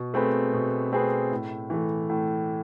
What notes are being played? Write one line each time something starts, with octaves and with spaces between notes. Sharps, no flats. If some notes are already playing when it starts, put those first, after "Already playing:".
Already playing: B2
A3 C4 G#4 B4
B2
A3 C4 G#4 B4
A2
E3 A3
A2